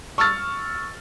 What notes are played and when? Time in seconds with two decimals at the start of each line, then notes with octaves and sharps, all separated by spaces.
0.18 C#6 E6 F6 A6